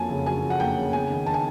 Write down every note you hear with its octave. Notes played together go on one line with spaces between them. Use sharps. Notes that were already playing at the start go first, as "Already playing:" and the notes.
Already playing: F2 F#3 A#3 G#5 A5
C#3
F#3 G#5
F2
F#5
A#3 G5
C#3
B3 G#5
D#3
D#3 A5
G#5